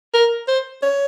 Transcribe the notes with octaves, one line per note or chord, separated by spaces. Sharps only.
A#4
C5
C#5